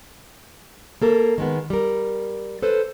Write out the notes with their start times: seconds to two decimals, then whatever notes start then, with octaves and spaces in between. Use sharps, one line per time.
1.02 A#3 A4 A#4
1.38 D#3 G#3 B3
1.70 G3 A#4
2.62 A4 B4 C5